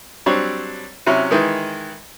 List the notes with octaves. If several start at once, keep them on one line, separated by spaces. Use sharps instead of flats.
F#3 G3 C4 D4 C#5
C3 F#3 C#4 E4
D#3 E3 G#3